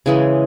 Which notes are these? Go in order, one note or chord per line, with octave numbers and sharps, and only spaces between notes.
C#3 E3 G#3